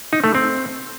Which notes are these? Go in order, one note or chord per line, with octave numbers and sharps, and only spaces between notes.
D#4
A3
C4